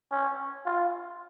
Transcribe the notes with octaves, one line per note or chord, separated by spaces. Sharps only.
C#4
F4